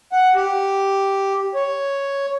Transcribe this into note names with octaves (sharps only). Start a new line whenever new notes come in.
F#5
G4
C#5